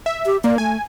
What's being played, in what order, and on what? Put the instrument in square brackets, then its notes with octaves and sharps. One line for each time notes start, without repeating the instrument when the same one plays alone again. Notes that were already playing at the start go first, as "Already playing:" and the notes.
[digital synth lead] E5
[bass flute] G4
[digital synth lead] A#3 [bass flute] D5
[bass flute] A3 [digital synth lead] G#5